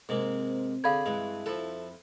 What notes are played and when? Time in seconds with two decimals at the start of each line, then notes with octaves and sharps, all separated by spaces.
0.09 G#2 C3 G#3 A#3
0.84 D3 G#4 F5 B5 G#6
1.06 G2 E3 G#3
1.46 F2 F3 E4 A4